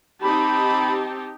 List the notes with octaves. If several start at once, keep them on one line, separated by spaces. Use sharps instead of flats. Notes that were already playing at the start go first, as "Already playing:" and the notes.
C4 D#4 G4 A5 B5